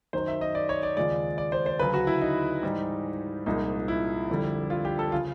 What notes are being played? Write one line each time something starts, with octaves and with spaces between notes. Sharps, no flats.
F#2 D#3 F#3 C5
E5
D#5
D5
C#5
D5
D#2 C#3 F3 G#3 D5
D5
C5
C5
D2 C#3 F#3 B4
F#4
E4
D#4
G#2 E3 G3
C2 A#2 F3 G#3 D#4
E4
F2 D3 G3
F4
G4
A4
C#3 F3 F4